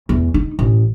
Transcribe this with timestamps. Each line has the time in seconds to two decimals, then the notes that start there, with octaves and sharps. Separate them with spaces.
0.09 E2
0.34 D#4
0.59 A1